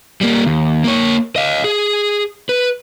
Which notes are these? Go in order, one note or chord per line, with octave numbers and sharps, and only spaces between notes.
G3 A#3
D#2
A#3 C#5
D#5 F5
G#4
B4